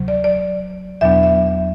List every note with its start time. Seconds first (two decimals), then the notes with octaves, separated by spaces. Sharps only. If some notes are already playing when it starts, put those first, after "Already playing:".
Already playing: D2 C3 F#3
0.08 D5
0.24 D5
1.01 E2 B2 F#3 B3 D4 E5
1.23 E5